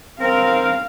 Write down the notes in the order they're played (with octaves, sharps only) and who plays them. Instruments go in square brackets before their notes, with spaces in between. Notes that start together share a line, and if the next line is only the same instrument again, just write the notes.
[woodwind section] C4 A#4 [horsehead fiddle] F5